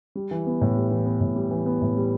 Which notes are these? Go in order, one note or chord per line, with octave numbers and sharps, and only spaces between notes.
G3
E3
B3
A2
G3
E3
B3
A2
G3
E3
B3
A2
G3